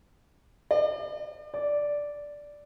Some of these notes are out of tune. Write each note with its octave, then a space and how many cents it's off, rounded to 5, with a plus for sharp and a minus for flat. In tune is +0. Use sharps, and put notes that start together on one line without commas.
D5 +40
D5 -5